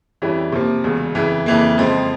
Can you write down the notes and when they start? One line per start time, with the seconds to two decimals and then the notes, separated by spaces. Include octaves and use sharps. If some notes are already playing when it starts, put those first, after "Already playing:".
0.22 F2 E3 G3 C#4 E4
0.52 C3 F3 A#3
0.84 E1 E2 C#3
1.15 F2 C#3 E3
1.46 F2 C#3 E3 A#3
1.77 F2 C#3 F3 G#3 C4